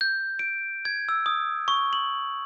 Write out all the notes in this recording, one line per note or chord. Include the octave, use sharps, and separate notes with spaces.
G6
D7
G#6
E6
D#6
C#6
F#7